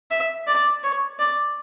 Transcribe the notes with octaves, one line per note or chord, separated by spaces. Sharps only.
E5
D5
C#5
D5